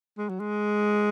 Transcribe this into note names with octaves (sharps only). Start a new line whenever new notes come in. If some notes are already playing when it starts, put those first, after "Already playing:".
G#3
F#3
G#3